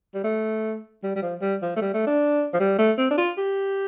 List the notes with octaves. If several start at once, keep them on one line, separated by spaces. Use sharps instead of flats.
G3
A3
G3
G3
F3
G3
F3
A3
G3
A3
D4
F3
G3
A3
C4
D4
F4
G4